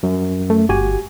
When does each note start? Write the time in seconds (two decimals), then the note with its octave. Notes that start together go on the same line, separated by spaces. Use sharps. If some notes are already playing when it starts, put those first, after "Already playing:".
0.03 F#2
0.50 A3
0.69 G1 F#4 G4 G#5